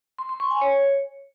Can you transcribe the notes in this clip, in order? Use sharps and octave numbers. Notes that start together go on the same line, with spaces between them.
C6
C6
C#6
G#5
C#5